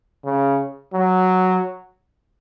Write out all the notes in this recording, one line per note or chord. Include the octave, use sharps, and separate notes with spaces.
C#3
F#3